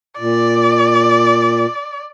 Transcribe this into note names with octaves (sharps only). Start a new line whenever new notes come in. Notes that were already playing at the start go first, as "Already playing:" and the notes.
A#2 D5